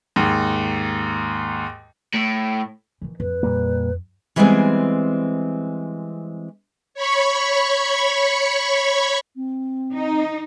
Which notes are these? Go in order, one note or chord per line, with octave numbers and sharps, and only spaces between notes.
D#2 G#2
A2
D#3 E3
F2 B4
A#2 G3 A#3
E3 G3 G#3 B3 C4 G#4
C#5 B5 C#6
C4
D#4